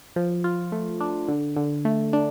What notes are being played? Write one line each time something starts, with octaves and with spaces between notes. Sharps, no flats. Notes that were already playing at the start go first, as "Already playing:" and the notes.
F3
F4
A3
D4
D3
D3
A3
D4